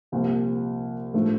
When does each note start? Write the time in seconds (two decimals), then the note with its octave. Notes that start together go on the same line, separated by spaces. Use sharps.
0.12 C2 A#2 F3
1.14 A2 F3 A3 D4